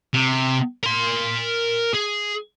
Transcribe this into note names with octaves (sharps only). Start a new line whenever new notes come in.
C3
A#4 C6
G#4